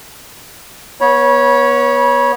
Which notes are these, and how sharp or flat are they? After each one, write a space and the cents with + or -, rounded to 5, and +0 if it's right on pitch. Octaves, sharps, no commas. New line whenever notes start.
B3 -25 C#5 +0 B5 -35